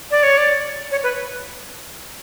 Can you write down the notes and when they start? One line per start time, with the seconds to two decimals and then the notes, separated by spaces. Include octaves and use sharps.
0.11 D5
0.23 C#5
0.37 D5
0.91 C#5
1.03 B4